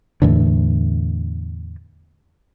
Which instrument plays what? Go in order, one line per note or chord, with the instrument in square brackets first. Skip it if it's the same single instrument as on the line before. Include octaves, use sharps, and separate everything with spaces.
[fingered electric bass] E2 A2 D3